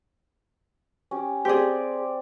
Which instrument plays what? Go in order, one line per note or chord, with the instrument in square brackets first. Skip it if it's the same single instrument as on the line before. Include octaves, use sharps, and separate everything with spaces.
[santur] C#4 G4
[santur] C4 D5 [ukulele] G4 G#4